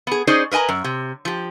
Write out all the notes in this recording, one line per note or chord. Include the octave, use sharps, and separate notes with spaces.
B3 G#4
C#4 D#4 G#4 C5 D5 D#5
A#4 B4 D#5 G#5 A#5
F#2
C3
F3 G4